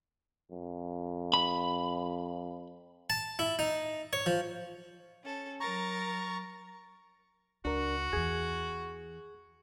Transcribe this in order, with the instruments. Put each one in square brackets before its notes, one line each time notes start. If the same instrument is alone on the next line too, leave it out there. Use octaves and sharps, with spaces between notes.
[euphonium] F2
[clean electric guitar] B5
[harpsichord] A5
E4
D#4
C#5
F3
[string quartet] C#4 A4
[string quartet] F#3 A#4 A6 [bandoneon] A#5 C#6
[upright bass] C#2 [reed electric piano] D4 A#4 [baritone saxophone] F#4
[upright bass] E2 E3 [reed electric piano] G#4 G#6